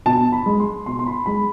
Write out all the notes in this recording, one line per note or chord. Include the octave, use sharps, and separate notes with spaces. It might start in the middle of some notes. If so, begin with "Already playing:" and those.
B2 A5
B5
G#3
C6
B2 C6
C6
B5
G#3 B5